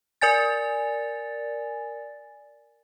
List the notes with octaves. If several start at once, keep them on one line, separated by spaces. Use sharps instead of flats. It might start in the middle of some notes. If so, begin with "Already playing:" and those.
A#4 D5 G#5 A6